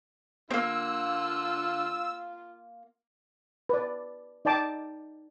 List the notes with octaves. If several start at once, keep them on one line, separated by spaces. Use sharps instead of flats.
D3 A#3 C4 F4 E6
B4 D5
D#4 D5 G5 A5 D6